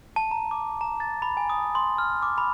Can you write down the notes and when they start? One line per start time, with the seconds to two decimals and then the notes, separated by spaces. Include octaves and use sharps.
0.16 A5
0.31 A#5
0.51 D6
0.81 A#5
1.00 A6
1.22 B5
1.37 G#5
1.50 D#6
1.75 C6
1.98 F6
2.22 D6
2.38 B5